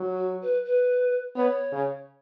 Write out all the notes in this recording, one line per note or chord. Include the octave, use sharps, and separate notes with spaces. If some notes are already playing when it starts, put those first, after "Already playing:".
Already playing: F#3
F#4
B4
B4
B3 C#5
C#3